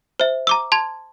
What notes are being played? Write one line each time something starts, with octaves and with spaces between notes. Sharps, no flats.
C5 E5
A#5 D6 E6
A5 C6 G#6